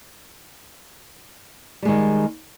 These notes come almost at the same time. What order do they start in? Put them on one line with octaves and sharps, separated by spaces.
G3 G#3 D#3